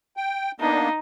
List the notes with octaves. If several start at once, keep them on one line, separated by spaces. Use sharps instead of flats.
G5
A#3 B3 D4 D#4